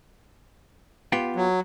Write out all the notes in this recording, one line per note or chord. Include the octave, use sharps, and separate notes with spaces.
B3 F4 G4
F#3